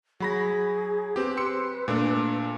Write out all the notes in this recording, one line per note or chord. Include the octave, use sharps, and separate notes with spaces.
F#3 G#4 B5 A#6
C4 G4 B4
C6 E6 C#7
A#2 A3 D4